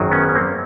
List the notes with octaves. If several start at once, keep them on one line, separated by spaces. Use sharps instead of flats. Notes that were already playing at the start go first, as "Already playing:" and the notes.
Already playing: G#1 F#2 D#3 F#3
B3 C#4
C#4
A#3 C4